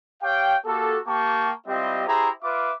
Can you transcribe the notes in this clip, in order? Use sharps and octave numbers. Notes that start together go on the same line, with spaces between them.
G4 C#5 F5 G5
A#3 F#4 G4 A4
A#3 G4 G5 A5 C#6
G3 C4 E4 F4 G4 D#5
E4 G4 G#4 C5 A#5
F4 B4 E5 D6